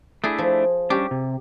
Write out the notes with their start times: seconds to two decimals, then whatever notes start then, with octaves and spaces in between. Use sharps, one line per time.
0.24 A3 D4 E4 G#4
0.38 F3
0.90 G3 C#4 D4 G4
1.11 C3